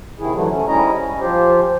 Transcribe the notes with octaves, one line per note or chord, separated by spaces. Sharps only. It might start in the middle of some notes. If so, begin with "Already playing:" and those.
C3 D#3 E4 G#4
G#2 D3 E3 F#3 A3
A3 C#4
G#2 G3 C#4 E4 D#5 A#5
C#4
F3 F4 G4 C5